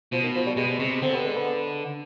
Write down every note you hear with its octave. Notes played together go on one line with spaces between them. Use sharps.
B2 F3
D#3
F3
G3
B2 G#3
C3 G#3
D3 C4
B3
G#3
B3